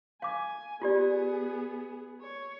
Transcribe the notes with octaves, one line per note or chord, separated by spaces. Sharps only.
F5 G#5 D6
B3 F4 G4 G#4 D5
C#5